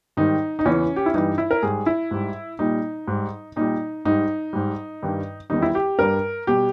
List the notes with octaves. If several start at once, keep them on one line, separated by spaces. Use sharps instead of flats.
G#2 D#3 G3 D#4
D#4
E2 C#3 E3 C#4
G4
E4
G2 E3 G3 D#4
E4
A#4
G#2 G3 G#4
E4
G#2 G3
A#2 G3 D#4
G#2 G3
A#2 G3 D#4
G#2 G3 D#4
G#2 G3
G2 D#3 G3
E2 D#3 G3 D#4
E4
G4
G2 G3 A#4
B2 G3 G4